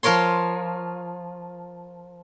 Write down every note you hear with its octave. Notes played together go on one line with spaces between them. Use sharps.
F3 F4 A#4 C#5 C6